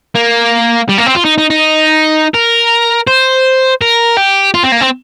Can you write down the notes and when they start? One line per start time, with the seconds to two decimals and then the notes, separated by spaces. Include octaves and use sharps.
0.15 A#3
0.89 G3
0.98 A#3
1.07 C4
1.15 F4
1.25 D#4
1.38 D#4
1.50 D#4
2.34 A#4
3.07 C5
3.82 A#4
4.17 G4
4.54 F4
4.64 C4
4.72 A#3
4.81 C4